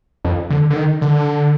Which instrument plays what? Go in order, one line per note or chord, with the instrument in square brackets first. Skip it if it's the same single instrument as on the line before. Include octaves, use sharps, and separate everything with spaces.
[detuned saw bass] F2
D3
D3
D#3
D3